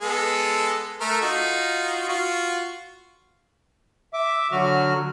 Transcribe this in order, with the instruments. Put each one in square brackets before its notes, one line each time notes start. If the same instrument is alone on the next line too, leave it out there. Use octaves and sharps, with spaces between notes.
[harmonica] G#3 B3 A4
A3 A#4
D#4 F4 F#4
F4 F#4
[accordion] E5 D6
D3 F#3 F#4 F6